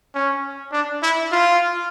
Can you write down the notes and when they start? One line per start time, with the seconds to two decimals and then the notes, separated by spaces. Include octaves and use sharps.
0.15 C#4
0.72 D4
1.03 E4
1.32 F4